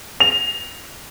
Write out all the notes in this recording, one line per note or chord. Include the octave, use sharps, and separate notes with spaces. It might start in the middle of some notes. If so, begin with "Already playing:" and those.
F7